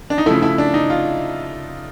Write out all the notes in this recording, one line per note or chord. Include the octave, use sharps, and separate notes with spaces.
D4
D#4
C#3 F3 A3 E4
E4
D4
D#4
F4